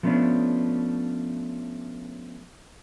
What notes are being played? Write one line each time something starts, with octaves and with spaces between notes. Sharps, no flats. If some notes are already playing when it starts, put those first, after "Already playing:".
F3 A3 B3 C#4 D4